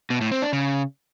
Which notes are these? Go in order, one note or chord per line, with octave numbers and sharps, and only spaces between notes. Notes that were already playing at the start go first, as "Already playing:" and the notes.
B2
A2
C4
D4
C#3